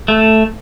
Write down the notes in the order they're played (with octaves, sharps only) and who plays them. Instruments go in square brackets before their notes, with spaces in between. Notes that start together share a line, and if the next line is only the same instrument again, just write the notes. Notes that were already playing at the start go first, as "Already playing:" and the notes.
[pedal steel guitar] A3